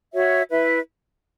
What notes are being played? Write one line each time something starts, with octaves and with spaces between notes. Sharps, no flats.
F#4 C#5 E5
E4 B4 E5